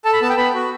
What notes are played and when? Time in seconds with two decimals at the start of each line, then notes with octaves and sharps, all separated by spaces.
0.05 A4 A5
0.13 B5
0.22 B3 A5
0.29 G5
0.37 B3 B5
0.54 F#4